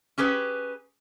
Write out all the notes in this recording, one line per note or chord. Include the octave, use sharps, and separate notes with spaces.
C#4 G4 G#4 B4